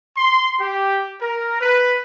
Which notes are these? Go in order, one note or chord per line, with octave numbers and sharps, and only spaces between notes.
C6
G4
A#4
B4